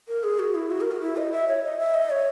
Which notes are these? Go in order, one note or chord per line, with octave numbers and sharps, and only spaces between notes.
A#4
G#4
F#4
E4
F#4
A#4
F#4
E4
D#5
E5
C#5
D#5
E5
D#5
C#5